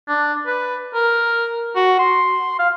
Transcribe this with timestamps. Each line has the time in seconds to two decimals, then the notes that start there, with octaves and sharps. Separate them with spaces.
0.09 D4
0.46 B4
0.94 A#4
1.76 F#4
1.99 C6
2.59 F5